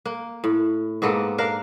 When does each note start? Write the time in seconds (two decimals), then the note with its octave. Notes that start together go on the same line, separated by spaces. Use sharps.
0.05 A#3
0.44 A2
1.02 G#2 A#3 B3 A4
1.38 D4 A#4 F5